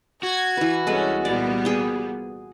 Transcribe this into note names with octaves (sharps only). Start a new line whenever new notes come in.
F#4 G#6
E3 B4
C2 G#3 C#4 A4 B4
A#2 G3 B3 D5
G#4 G5